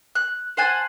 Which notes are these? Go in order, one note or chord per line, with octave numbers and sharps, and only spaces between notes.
F#6
C5 F#5 G#5 A5